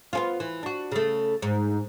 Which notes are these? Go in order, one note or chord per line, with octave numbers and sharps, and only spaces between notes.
B3 C#4 F4
E3
D4 F#4
C#3 A3
G#2